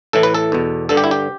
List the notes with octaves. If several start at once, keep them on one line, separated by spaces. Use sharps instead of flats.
A2 E3 A4
B4
A4
E2 B2
G2 D3 A4
G4
E4
G4